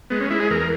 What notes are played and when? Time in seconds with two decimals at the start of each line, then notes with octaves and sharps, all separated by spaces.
0.10 G#3 B3
0.20 C#4
0.30 G#3 E4
0.40 G#4
0.50 E2 A#4